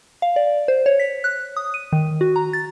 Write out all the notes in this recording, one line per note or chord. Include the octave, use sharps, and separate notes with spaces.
F5
D5
C5
C#5
B6
F#6
D#6
D#7
D#3
F#4
A#5
A6